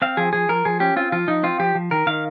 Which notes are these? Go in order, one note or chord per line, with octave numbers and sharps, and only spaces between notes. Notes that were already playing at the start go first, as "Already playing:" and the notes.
C4 F5
F3 G#4
F3 G#4
F3 A#4
F3 G#4
C#4 G4
C4 F4
F3 F4
F3 D#4
C4 F4
F3 G4
F3
D#3 A#4
D#3 F5